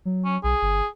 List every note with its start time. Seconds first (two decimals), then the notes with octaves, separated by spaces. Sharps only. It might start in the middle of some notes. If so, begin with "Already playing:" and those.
0.05 F#3
0.25 C#4
0.44 B1 G#4
0.62 G1